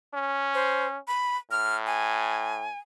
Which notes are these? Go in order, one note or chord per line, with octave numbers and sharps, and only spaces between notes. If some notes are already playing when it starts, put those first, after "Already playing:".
C#4
C5
B5
A2 F6
G#5